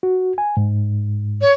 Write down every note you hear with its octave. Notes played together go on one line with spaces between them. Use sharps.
F#4
G#5
G#2
C#5